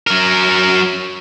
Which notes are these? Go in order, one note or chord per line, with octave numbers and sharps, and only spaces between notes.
F#3 A#4